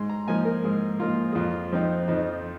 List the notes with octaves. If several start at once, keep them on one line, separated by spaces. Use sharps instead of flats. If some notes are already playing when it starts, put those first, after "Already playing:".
Already playing: G#2 C6
A#5
F3 A#3 D#4 G#5
A#4
G#2 G#4
F3 A#3 D#4 F4
G#4
F2 F4
F3 C4 D#4
F2 D#4